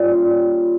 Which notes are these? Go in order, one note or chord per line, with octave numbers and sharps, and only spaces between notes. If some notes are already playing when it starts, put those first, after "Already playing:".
Already playing: G3 A#3 C#4 F4